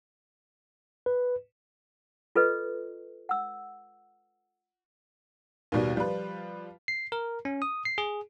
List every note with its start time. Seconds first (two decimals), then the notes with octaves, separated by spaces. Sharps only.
1.06 B4
2.36 F4 A4 B4 D#5
3.29 F#5 E6
5.72 D#2 B2 G3
5.96 F3 G3 F4 B4
6.88 C7
7.12 A#4
7.45 C#4
7.62 D#6
7.85 C7
7.98 G#4